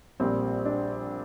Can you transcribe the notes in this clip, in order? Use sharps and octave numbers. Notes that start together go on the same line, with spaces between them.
A#1 A#2 G3 C4
D4